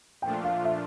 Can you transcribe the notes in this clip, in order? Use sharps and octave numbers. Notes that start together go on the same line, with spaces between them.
A#2 F3 A3 D4 F4 G5
F5
E5